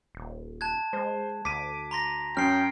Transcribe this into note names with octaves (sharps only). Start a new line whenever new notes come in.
D#1
A5 F#6 G#6
G#3 C5
D2 D6 B6 D#7
A#5 C6 A#6
F#2 C#4 G5 F6 C7